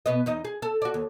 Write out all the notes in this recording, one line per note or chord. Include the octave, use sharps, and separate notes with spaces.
B2 B3 D#5
E2 D#4 D#5
G#4
A4
F#4 D5
D#2